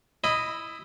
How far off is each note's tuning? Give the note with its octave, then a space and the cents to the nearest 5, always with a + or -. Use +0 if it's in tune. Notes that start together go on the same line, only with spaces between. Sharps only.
E4 -5 D#5 +0 B5 +20